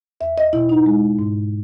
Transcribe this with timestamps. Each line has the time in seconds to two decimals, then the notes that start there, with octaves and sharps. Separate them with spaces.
0.21 E2 E5
0.38 D#5
0.53 B2 E4
0.69 D#4
0.86 G#3
1.19 G#2